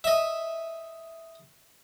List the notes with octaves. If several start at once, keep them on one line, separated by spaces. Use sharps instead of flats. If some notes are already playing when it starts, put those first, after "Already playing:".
D#5 E5